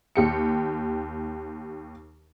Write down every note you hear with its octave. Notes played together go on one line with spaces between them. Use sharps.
D#2 G4 C#7